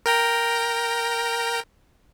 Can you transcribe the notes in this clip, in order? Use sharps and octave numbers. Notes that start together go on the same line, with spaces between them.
A#4 G5 A#5